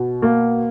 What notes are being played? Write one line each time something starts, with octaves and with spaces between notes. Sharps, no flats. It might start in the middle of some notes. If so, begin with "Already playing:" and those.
Already playing: B2
A#3